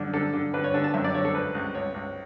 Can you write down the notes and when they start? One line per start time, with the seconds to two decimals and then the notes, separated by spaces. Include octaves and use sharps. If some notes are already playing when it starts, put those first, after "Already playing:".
Already playing: F#2 D3
0.13 D3 A4
0.33 D3
0.54 D3 B4
0.64 C#5
0.74 D3 A5
0.84 A5
0.94 F#2 E5
1.04 D5
1.14 D3 C#5
1.25 A4
1.35 C#2 B4
1.55 C#2
1.75 C#2 C#5
1.94 C#2